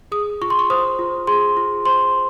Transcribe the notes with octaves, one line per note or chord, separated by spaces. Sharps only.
G#4 D#6
F4 C#6
C6
C#6
C5 D#6
F4
G#4 C6
F4
C5 C6